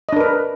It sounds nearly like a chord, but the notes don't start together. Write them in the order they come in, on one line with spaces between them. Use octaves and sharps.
D#5 D4 A#4 B4